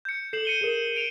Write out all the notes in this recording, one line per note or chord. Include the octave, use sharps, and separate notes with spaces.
G6 C#7
A4 G6 C7 E7 F#7
C#7 D#7 G7
G#4 A#4
D7 F7